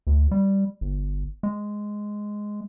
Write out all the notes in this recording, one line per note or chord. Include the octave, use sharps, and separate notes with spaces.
D2
G3
G1
G#3